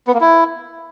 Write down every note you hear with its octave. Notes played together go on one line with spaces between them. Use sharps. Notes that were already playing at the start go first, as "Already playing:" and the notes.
B3
A#3
E4